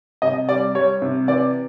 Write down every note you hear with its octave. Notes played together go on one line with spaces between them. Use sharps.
C3 D#5
G3 D5
G3 C#5
C3
E3 D5